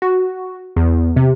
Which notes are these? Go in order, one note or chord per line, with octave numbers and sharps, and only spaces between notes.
F#4
E2
C3